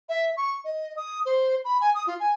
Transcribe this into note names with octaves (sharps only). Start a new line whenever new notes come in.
E5
C#6
D#5
D#6
C5
B5
G#5
D#6
F4
G#5